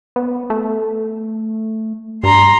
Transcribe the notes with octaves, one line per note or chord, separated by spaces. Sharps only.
B3
A3
G2 A#5 C6